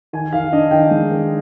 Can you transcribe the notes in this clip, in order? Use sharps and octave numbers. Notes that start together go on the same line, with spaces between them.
D#3 G#5
D#3 F5
D4 D#5
D#3 G5
G#3
D#3